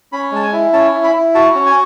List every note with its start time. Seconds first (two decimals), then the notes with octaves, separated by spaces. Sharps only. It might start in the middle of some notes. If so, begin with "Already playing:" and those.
0.12 C#4 B5
0.32 G#3 A5
0.43 G#5
0.53 E4
0.73 C#4 A5
0.94 E4
1.04 B5
1.15 E4
1.35 F#4 A5
1.55 C#4
1.66 G#5